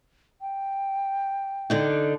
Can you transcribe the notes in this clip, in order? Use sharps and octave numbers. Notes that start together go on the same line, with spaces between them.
G5
D3 D4 D#4